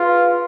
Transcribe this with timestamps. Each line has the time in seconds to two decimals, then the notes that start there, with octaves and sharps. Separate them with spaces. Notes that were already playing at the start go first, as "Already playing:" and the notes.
Already playing: F4 G#4 B4